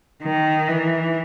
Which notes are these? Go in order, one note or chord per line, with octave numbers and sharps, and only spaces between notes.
D#3
E3